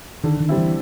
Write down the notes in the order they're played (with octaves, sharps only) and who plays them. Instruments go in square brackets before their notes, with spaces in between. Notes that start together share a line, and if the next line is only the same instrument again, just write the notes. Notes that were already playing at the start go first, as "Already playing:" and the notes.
[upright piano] D3 [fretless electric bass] D#3
[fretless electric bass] D#3
[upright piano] G3 C4 E4
[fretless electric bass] E3